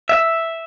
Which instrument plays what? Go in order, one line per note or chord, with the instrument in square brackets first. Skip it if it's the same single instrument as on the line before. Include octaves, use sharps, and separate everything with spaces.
[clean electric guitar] E5